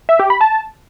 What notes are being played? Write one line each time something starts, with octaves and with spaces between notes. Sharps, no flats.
E5
G4
B5
A5